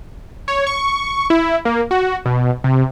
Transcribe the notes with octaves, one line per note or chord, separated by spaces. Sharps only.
C#5
C#6
E4
A#3
F#4
B2
C3